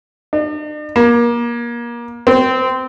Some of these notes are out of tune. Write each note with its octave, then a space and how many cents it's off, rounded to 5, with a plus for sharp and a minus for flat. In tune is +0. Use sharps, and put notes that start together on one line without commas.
D4 +45
A#3 +25
C4 -15